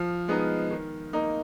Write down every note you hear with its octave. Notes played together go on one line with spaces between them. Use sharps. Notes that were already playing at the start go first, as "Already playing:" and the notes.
Already playing: F3 F6
G#3 B3 D#4
D#3
A#3 D#4